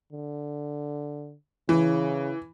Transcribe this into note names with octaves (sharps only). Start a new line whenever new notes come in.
D3
C#3 E3